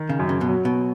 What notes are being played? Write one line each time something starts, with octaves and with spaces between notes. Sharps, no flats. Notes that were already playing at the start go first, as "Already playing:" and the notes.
Already playing: D#3
C#3
F#2
C#3
B2
F#3
B2